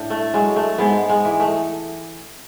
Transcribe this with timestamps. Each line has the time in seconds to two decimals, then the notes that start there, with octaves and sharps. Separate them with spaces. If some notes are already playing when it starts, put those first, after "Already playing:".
Already playing: A2 D4
0.10 A3
0.34 F#3 G#3
0.56 A3
0.78 G#2 G#3 B3
1.09 G#3
1.25 E3
1.40 A3